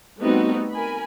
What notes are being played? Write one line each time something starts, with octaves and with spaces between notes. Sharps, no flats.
G3 A3 B3 C4 D#4 F#4
A#4 G#5 B5